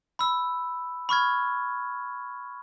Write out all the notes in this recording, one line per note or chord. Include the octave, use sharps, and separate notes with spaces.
B5 E6
B5 C#6 F6 G#6